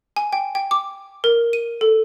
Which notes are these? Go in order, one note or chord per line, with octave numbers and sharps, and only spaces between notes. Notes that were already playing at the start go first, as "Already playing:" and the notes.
G#5
G5
G5
D6
A#4
D#7
A4